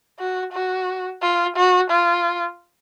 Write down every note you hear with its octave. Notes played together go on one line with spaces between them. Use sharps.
F#4
F#4
F4
F#4
F4